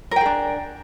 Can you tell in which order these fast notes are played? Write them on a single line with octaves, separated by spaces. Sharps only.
A#4 G5 G#4 D4